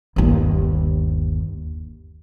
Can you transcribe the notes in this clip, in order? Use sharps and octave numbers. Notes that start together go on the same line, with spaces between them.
G1 D#2